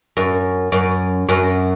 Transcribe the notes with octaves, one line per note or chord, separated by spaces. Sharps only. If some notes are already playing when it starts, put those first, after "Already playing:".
F#2
F#2
F#2